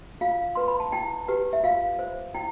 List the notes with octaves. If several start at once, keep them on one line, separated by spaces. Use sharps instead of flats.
F4 F5
B4 C6
B5
A5
E4 G5
G4 B4
E5
F4 F5
C5
E4 G5